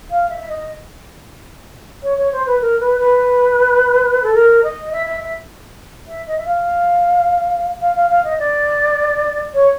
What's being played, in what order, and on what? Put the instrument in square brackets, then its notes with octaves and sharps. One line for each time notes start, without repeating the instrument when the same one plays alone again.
[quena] F5
E5
E5
D#5
C#5
C#5
C5
B4
A#4
B4
B4
A4
A#4
D#5
E5
E5
E5
E5
D#5
E5
F5
F5
F5
F5
D#5
D5
C#5